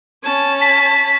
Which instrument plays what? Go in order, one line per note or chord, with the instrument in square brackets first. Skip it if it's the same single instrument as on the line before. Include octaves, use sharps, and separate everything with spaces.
[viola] C#4 A5
[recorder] B6